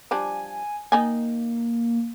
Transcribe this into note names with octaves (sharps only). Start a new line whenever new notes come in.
F3 G3 D4 G#5
D#3 A#3 D#4 G#5